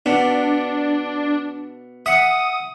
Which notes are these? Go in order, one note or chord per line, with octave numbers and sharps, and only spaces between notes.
B2 D4
E5 F#5 D#6